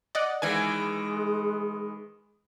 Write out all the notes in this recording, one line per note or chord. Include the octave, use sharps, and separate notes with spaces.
D5 D#5 F#5
D#3 E3 G#3 G#5 G#6